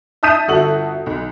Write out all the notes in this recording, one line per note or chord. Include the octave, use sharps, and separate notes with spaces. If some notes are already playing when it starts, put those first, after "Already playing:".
E5 A5 D#6 G6 B6 D#7
G1 F#4 A4 E5 F#7
B1